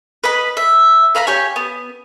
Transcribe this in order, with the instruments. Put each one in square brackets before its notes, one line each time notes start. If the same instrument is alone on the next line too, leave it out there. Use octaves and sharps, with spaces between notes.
[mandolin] B4 D#5 B5
E5
B4 F5 A#5 B5
G4 C#5 G#5
B3